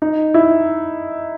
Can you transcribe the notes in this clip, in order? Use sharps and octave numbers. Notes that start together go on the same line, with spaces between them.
D#4
E4